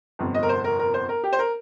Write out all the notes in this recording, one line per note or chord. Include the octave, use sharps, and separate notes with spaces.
G1 F2 C3
D#5
A#4
C5
A#4
A#4
C5
A#4
G4
C5
A#4